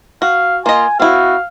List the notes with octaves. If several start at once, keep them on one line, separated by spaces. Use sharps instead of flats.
F#4 F5
A#3 F4 D#5 G#5
C4 E4 F#4 F5